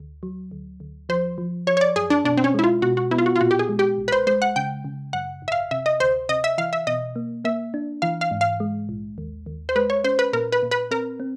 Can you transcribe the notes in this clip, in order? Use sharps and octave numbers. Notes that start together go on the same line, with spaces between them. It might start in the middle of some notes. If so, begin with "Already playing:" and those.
Already playing: D2
F#3
D2
D2
F3 C5
F3
F3 C#5
C#5
D5
F#2 G#4
D4
B2 D4
C4
C#4
G#3 E4
F4
B2 F#4
F#4
B3 E4
F4
F#4
F4
A#2 F#4
G4
G#4
G#3
G4
B1
B4
C5
G#3 C5
F#5
C#3 G5
C#3
F#2 F#5
G#1
E5
F5
C3 E5
D#5
D2 C5
C3 D#5
E5
E3 F5
E5
B2 D#5
A#3
A#3 E5
D4
E3 F5
F5
G#2
F5
G#3
A#1
D#2
D#2
C5
G#3 B4
C#5
C#4 C5
B4
A#2 A#4
B4
A#2
B4
C4 A#4
C4